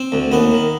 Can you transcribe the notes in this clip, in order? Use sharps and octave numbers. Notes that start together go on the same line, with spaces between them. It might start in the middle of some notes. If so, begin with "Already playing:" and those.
Already playing: C4
D2
D#2 B3
D#3